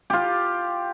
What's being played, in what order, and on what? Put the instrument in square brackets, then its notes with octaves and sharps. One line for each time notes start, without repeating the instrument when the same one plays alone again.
[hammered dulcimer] F4 G4